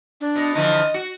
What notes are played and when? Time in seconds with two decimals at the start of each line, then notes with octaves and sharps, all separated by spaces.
0.21 D4
0.36 B2
0.55 D3 E3 F3 D#5
0.94 F#4